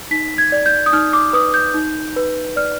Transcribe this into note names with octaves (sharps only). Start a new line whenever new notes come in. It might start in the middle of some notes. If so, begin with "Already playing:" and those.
D#4 B6
G#6
D5
G6
D#6
D#4 F6
D6
B4 D#6
G6
D#4
B4
D5 F6